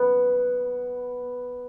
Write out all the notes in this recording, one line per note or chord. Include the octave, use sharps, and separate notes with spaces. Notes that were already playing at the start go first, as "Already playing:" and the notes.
Already playing: B3